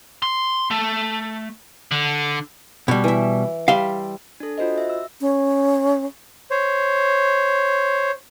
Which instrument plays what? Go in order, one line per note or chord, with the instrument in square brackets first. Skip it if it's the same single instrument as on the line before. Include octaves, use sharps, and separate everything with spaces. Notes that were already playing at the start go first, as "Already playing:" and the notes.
[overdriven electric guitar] C6
A3
D3
[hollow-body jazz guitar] B2 G3
[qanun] E3 E5
[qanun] G3 E5 C6 [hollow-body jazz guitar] F5
[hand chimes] D4 A4
F4 F#4 C5 D#5
E5
E6
[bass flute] C#4
[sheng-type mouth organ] C5 C#5